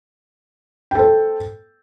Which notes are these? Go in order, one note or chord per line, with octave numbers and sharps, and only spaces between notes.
A4 C5 G5